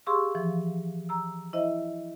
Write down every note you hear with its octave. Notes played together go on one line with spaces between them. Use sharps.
G4 G#4 F5 C6 C#6 E6
E3 F3
A#5 E6
E4 C5 D#5 E5